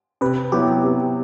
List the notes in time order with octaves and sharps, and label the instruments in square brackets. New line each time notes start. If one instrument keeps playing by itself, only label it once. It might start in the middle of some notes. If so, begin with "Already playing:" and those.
[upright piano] C3 [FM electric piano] B4
[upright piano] F#3 B3 E4 [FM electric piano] G4
[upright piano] C3